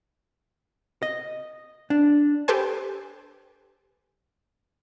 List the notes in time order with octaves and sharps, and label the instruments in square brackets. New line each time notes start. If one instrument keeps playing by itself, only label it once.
[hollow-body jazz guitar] D#5
D4
[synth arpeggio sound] G4 A4 B4 C5 G#5